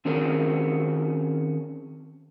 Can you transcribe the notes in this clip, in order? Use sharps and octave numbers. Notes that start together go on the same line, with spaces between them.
D#3 C4 C#4 G#4 A#4